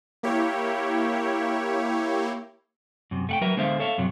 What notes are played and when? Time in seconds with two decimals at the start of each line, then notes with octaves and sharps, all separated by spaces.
0.23 A#3 E4 G4 C#5
3.11 F#2 C3
3.29 A3 F#5 G5
3.41 F#3 A#4 B4 E5
3.57 D3 G#3 B3 C5 E5 F5
3.80 A4 C#5 E5 F5
3.98 F#2 C3 F#3